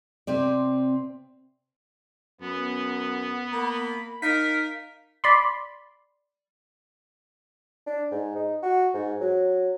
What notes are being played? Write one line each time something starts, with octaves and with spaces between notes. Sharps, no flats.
C3 C4 D5
F#2 B3 B4
A#3 B5
D#4 A#4 F5 B6
D5 B5 C6
D4
G#2
D#4
F#4
G#2
F#3